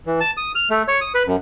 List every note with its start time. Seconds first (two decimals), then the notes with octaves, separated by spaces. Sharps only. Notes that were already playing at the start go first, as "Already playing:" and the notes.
0.06 E3
0.20 A5
0.37 D#6
0.55 F6
0.70 A3
0.88 C#5
1.01 D#6
1.15 B4
1.27 F#2